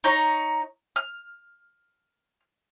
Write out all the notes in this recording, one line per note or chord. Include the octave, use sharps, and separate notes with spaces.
D#4 C#5 A#5
F6